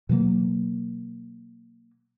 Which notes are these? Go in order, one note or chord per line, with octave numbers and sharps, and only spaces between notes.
B2 E3 F#3 A#3